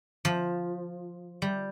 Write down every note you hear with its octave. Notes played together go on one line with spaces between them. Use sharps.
F3
G3